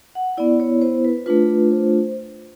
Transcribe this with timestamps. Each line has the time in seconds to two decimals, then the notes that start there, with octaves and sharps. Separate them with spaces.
0.15 F#5
0.37 B3 E4 D5
0.60 C#5
0.82 C5
1.05 B4
1.26 A3 D4 F4 B4
1.71 C5